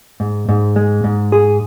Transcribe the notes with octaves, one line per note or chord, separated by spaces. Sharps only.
G#2
G#2
G#3
G#2
G#4